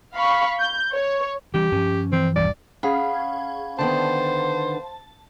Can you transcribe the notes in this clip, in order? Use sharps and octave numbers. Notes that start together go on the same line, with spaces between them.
F5 B5 C#6
G6
C#5
E3 G3 C#4 G4
G2 F3 C#4
E3 C4
E1 B1 G2 D5
C#4 G#4 F5 F#5 B5
D3 D#3 B3 C5 A5